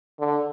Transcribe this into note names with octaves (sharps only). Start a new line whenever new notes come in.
D3